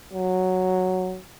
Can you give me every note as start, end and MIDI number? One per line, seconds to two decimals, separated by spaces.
0.13 1.18 54